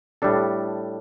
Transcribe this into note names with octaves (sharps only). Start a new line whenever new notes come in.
A2 G3 D4 A4